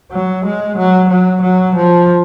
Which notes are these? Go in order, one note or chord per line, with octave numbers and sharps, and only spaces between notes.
F#3
G#3
F#3
F#3
F#3
F3